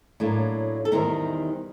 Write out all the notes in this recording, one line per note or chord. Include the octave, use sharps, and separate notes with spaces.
A2 F#3 A#3 D4
A4
E2 C3 D#3 G3 C4 A#4